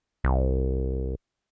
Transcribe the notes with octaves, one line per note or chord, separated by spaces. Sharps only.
C2